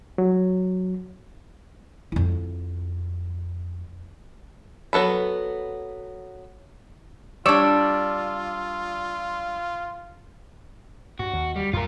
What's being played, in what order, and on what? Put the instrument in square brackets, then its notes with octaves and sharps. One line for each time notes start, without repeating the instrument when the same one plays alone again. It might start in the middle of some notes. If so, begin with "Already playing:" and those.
[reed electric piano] F#3
[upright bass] F2 E4
[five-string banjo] F#3 B3 A4 B5
[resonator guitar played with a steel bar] G3 D4 [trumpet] F4 [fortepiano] C#5 D5 [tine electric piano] E6
[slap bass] G2 [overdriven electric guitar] F#4
[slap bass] D#2
[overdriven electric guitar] G3
[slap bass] F#2 A#3 [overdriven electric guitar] F4 A#4